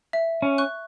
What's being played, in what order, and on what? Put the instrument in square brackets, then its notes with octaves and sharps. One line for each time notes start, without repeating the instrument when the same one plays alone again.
[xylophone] E5
[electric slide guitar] C#4
[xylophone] C#6 F#6